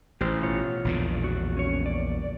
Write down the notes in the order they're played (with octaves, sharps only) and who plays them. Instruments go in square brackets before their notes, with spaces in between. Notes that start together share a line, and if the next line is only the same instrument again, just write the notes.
[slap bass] A1 [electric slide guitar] G4 C5
[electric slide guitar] B2 F4 C#5
[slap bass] A#1 E2 D3
[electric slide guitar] F#4
C#4 C#5
D5